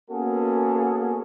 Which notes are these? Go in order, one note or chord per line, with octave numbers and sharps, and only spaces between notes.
A#3 B3 C#4 F#4 G#4 A4